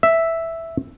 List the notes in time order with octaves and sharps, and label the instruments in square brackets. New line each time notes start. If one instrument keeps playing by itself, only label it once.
[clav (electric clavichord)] E5